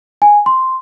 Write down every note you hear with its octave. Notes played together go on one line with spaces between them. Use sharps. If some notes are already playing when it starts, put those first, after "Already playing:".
G#5
C6